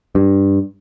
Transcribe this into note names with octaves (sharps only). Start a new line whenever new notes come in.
G2